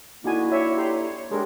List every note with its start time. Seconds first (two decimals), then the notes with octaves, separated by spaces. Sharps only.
0.24 D3 A#3 D#4 E4 F#4 G#5
0.52 C#5 E5
0.76 G4 A#5 C6
0.93 C#5
1.31 D3 G#3 D4 G4 G#4 A#4